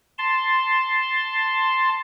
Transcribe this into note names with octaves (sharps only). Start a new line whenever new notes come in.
A5 C6